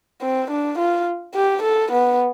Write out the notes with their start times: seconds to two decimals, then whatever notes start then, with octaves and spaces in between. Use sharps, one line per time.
0.22 C4
0.50 D4
0.78 F4
1.35 G4
1.63 A4
1.92 B3